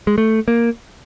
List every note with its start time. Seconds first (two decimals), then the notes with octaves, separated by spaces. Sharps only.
0.07 G#3
0.18 A3
0.48 A#3